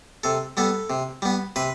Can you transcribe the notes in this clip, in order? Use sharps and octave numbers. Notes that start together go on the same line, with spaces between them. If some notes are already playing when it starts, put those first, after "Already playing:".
C3 A4
G3 B3 A4
C3
G3 B3
C3 B4